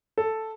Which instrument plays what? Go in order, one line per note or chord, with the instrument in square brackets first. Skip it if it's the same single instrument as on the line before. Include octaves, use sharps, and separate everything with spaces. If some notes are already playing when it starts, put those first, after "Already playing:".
[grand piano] A4